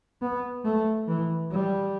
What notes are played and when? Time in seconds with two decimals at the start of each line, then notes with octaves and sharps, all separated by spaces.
0.22 B3
0.65 A3
1.08 E3
1.51 G3